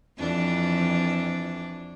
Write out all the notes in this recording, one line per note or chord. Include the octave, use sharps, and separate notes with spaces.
F2 E3 D4